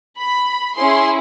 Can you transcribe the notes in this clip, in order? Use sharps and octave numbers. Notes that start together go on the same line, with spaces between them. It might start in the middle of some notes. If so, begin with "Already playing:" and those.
B5
C#4 E4 G#4 C6